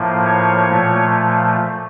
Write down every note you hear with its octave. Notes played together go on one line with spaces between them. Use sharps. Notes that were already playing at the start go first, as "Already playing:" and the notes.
Already playing: A2 F3 A#3
C#5
A#2 F3 A3